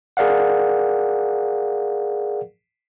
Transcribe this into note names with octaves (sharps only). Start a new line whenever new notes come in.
G#4 A#4 D5 F5 F#5